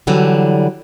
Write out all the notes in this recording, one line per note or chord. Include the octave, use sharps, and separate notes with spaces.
D3 E3 F#3 G3